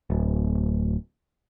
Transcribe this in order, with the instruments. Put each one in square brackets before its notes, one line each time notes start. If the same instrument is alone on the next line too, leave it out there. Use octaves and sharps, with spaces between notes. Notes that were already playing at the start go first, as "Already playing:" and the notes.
[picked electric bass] D1